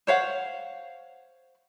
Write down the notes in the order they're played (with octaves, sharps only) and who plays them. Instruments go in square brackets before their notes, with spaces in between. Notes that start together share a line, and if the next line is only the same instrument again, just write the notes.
[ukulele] C5 C#5 F5 F#5